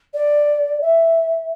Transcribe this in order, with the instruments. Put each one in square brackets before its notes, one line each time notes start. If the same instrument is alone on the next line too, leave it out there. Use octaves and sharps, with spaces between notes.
[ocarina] D5
E5